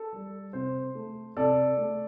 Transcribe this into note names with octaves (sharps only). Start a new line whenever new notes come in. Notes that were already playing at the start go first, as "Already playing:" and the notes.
Already playing: A4
G3
C3 C5
A3
C3 A4 D5
A3